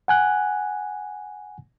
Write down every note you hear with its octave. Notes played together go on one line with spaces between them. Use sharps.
F#5 G#5 F#6